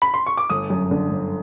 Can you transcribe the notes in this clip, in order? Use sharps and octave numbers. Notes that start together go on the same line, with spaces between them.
B5
C6
C#6
D6
G1 D#6
F#2
D3
G1